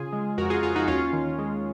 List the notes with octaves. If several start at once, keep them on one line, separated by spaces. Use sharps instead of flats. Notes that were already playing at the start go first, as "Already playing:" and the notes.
Already playing: C#3 F4 G#4
G#3
F2 F#4 A#4
F4 G#4
F2 F4 G#4
D#4 F#4
D#2 C#4 F4
D#3
G#3